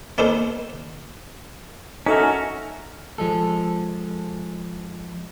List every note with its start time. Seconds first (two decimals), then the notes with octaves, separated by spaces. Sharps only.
0.18 A#3 B3 D4 D#4 A4 C5
2.06 C#4 D#4 F#4 A4 A#4 E5 G#5
3.18 F3 G#3 A4